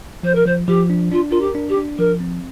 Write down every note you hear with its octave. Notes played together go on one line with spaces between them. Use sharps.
F3 C5
A#4
F3 C5
F3 G4
D4
D4 F4
F4 A#4
G4
D4
G4
D4
F3 A#4
C4